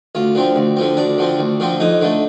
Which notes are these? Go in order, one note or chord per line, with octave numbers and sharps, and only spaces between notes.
D2 F4
D3 F3 C4
D2
D3 F3 C4
D2 D4
D3 F3 C4
D2
D3 F3 C4
F2 D#4
D3 A3